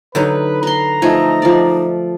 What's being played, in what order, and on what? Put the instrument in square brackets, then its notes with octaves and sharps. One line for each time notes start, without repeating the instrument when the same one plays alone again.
[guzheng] D3 F#3 D#4 [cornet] B4
[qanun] B4 C6 [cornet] A#5
[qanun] F3 A3 [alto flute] D#4 [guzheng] G#5
[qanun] F3 D5